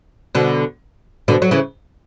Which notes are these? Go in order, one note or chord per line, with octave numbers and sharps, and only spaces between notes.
B2 D3
B2 D3
F#3
C#3 E3